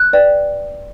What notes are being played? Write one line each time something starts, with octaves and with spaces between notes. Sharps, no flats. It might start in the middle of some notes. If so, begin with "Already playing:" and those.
Already playing: F#6
B4 D5 G5